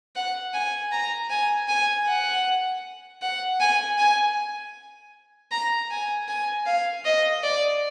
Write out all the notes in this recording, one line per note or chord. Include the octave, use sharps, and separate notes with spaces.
F#5
G#5
A#5
G#5
G#5
F#5
F#5
G#5
G#5
A#5
G#5
G#5
F5
D#5
D5